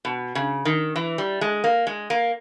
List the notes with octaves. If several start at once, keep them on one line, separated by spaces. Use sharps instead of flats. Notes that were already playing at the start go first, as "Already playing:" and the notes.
B2
C#3
D#3
E3
G3
G#3
A#3
G#3
A#3